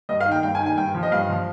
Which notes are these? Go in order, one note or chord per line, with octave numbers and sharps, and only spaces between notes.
G2 D#5
F5
D#3
G5
G2 G5
G#5
D#3
G#5
G2 G5
F3
D#5
G2 F5
F3